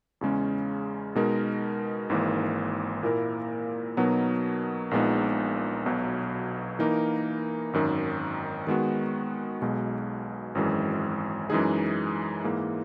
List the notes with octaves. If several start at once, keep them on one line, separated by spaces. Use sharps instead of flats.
E2 C#3 G#3 C#4
B2 G#3 D#4 A#4
G#1 G#2 E3 A#3
A#2 A#3 E4 A#4
B2 F#3 B3 D#4 A#4
A#1 A#2 G#3 B3 D#4
B1 B2 F#3
E3 A#3 D#4 A#4
G#1 F#2 D#3
D#3 G#3 B3 F#4
B1 B2 G#3
G#1 F#2 E3 G#3
F#2 E3 G#3 D#4 G#4
G#2 E3 A#3